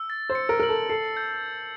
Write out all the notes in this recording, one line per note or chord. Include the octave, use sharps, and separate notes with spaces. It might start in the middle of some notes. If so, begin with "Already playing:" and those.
Already playing: E6
A6
C5
C#7
A#4
A#4 F#7
A4
A4 C7
G6